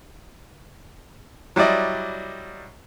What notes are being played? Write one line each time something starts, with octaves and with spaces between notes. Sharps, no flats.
F#3 G3 E4 D5 D#5